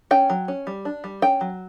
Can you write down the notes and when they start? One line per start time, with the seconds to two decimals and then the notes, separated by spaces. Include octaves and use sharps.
0.11 C#4 G5
0.30 F#3
0.48 C#4
0.67 G3
0.85 D4
1.04 G3
1.22 C#4 G5
1.41 F#3